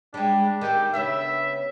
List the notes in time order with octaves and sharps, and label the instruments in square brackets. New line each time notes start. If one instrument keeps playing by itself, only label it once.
[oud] G3 G#3 [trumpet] D4
[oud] D#3 C4 [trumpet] G4
[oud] C#3 B3 D4 [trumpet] E5